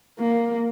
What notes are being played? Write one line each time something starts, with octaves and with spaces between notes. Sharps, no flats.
A#3